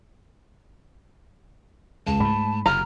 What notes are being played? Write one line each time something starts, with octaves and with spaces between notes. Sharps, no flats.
C#2 A5
G#2 A3 B5
F#1 C3 A#5 F6